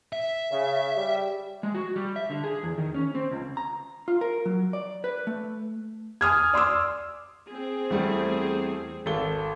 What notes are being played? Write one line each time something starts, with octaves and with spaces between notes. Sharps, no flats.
E5
C#3
G3
G#3
F#4
G3
E5
D3
G#4
E2
D#3
C#4
C4
C#2
A#5
F4
A#4
F#3
D5
B4
A3
G#5 D#6 F6 G#6
D5 C6 D6 E6
C4 G#4
E2 G3 A3
G#1 A4 G7